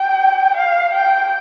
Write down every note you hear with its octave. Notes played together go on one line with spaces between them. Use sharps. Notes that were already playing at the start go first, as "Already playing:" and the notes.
Already playing: G5
F5
G5